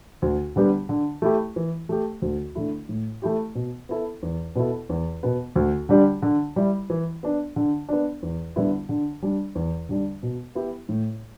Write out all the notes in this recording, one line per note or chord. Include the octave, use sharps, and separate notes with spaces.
D2
D3 G3 B3 G4
D3
A3 E4 G4
E3
A3 G4
D2
D3 A3 E4
A2
A3 E4 G4
B2
B3 E4 A4
E2
B2 B3 E4 A4
E2
B2 B3
D2
D3 G3 D4 G4
D3
G3 E4
E3
B3 D4
D3
B3 D4
E2
D3 G3 B3 E4
D3
G3 D4
E2
D3 G3 D4
B2
B3 E4 G4
A2